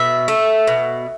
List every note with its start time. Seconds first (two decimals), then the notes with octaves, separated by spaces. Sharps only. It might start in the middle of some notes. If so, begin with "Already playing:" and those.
Already playing: B2 E5
0.28 A3
0.67 B2